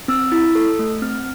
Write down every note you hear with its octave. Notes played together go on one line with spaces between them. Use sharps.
C4 E6
E4
A4
A3
C4 F6